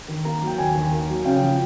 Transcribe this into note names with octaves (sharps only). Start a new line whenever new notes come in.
D#3
A#3 A#5
F#3
G5
D#2 G#5
D#3
A#3
F#3
C#3 G5
F3